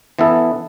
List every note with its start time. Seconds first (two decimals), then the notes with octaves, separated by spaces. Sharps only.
0.19 E3 B3 E4 A4